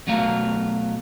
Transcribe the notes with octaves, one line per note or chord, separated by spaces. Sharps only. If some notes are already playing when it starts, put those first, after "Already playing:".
B2 F#3 A3 F5 A#5